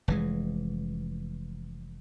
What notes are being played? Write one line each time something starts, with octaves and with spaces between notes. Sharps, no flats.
F1 E3 G#3